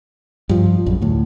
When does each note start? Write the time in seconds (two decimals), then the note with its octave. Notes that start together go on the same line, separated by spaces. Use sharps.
0.49 G2 F3
0.86 A#1 F#2
1.01 D2 A2